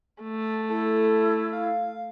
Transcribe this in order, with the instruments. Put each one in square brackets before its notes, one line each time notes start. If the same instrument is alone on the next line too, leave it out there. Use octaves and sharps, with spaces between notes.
[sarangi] A3
[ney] E4 [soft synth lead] A4
[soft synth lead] F5